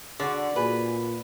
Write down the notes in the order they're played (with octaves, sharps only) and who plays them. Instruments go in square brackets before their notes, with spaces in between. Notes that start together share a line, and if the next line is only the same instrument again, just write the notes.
[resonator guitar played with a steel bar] D3 F#4 [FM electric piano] G#4 D6 [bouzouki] D5
[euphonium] A#2 [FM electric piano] F#4 G#4 G#5 [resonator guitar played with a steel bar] B4